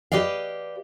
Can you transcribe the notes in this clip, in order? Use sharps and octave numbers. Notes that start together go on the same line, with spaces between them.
G4 B4 D5 D#5 F5